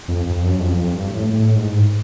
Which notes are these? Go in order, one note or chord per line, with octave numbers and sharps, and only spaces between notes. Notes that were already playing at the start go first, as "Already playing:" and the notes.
F2
F2
F#2
F2
F2
G2
A2
A2
G#2